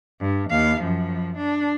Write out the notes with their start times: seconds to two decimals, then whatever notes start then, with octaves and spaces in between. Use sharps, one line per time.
0.21 G2
0.50 D#2 F5
0.82 F#2 F3
1.37 D4